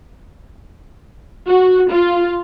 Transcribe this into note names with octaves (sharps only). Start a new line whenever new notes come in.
F#4
F4